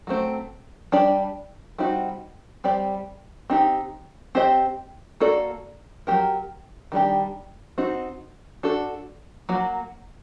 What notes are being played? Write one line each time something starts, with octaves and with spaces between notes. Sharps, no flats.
F#3 A3 C4
G3 D4 G4 D5
G3 C4 D#4 F#4
G3 C4 G4 D5
C4 D#4 G4
C4 G4 C5 D#5
A#3 F#4 A4 D5
F#3 C4 G4 A#4
D#3 G3 D4 G4
C4 D#4 F#4
D4 F#4 A4
F#3 A#3 F#4